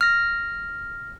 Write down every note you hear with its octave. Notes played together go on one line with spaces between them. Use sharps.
F6 A#6